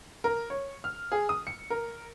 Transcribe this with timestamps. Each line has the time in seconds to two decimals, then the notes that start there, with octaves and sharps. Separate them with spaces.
0.24 A#4
0.50 C#5
0.84 F6
1.12 G#4
1.29 D#6
1.47 C#7
1.70 A#4